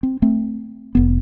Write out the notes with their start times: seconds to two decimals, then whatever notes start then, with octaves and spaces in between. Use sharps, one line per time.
0.03 C4
0.22 A3 C4
0.95 F1 B3